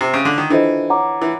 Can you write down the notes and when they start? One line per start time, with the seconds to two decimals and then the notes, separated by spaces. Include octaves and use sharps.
0.01 C3
0.14 C#3
0.25 D3
0.38 D#3
0.50 E3 D4 F4 A4 C5 D#5
0.89 C#5 F#5 A#5 D6
1.22 E3